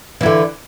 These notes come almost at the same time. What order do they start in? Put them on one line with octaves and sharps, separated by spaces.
E3 E4 D3